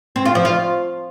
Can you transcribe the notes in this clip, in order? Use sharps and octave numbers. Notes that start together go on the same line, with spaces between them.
C4
F4
F3
F4